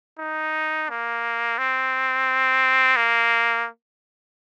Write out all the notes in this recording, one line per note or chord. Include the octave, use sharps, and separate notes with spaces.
D#4
A#3
C4
A#3